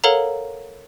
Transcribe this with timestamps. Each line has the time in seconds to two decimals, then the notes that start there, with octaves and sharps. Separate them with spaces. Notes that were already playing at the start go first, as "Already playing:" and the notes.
0.04 A4 A#4 C#5 F5 F#5 A#5